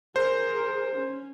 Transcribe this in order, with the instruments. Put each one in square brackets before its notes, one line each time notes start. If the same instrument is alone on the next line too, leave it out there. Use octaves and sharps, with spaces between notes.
[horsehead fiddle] G#4 A#4 [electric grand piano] C5
[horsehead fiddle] C#4